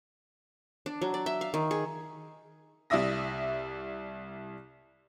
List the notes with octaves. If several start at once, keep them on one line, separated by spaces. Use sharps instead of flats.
D4
F#3
D5
E5
F5
D#3
G#4
C2 E4 D5 E5 D#6 A#6